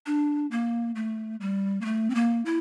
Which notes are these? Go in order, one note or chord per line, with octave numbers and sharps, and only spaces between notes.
D4
A#3
A3
G3
A#3
A3
C4
A#3
E4